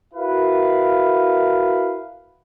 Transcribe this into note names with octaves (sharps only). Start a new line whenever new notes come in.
E4 F#4 A#4 B4 F5